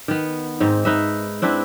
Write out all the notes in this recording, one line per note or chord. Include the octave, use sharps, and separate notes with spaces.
D#3 B3
G#2 C4 D#4
D#4 B4 E5
C4 D4 E4 B4